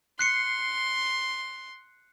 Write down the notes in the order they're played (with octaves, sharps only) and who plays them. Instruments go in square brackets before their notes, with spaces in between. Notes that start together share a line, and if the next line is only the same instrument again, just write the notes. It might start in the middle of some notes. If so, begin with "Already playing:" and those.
[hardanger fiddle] C6 [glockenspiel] F#6 C7 C#7